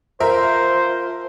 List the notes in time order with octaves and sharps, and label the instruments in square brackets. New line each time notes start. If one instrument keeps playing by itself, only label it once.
[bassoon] F3 [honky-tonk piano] A#4 E5 [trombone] C5